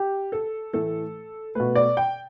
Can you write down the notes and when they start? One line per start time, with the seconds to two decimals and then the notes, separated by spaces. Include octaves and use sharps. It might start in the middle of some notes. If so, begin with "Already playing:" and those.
Already playing: G4
0.32 A4
0.73 A2 E3 A3 A4
1.55 B2 A3 B4
1.75 D5
1.97 G5